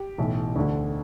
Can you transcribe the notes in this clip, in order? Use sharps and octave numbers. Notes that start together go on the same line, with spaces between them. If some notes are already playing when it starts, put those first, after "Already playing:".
Already playing: G4
B1 A2 E3
D2 D3